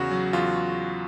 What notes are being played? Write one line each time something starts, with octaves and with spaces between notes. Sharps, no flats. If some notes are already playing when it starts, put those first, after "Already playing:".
Already playing: E2 C#3 F#4
F#3
E2 F4